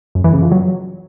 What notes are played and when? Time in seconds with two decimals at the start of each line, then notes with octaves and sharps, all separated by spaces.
0.15 F#2
0.24 E3
0.33 C#3
0.43 F3
0.52 F#3